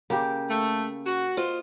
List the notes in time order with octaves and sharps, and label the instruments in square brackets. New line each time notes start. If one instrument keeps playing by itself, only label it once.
[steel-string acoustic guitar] C#3 [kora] A#3 G4
[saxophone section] A3
F#4
[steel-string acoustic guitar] F4 C5 D#5